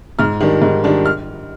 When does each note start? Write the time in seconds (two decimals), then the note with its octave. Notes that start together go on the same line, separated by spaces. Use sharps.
0.19 G#2 F6
0.40 D#3 G3 D4
0.62 G#2
0.84 D#3 G3 D4
1.06 F6